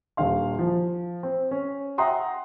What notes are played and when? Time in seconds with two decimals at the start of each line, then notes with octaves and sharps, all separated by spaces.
0.17 D#1 D3 F5 C6
0.59 F3
1.23 C4
1.51 C#4
1.98 E5 F#5 G5 A#5 C6 D#6